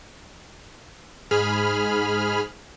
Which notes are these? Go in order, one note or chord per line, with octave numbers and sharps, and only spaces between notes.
G#2 G#4 B5 F6